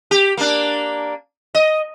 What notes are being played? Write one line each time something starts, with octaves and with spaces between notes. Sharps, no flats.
G4
A#3 D4
D#5